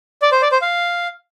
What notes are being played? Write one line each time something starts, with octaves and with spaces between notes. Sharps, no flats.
D5
C5
D5
C5
F5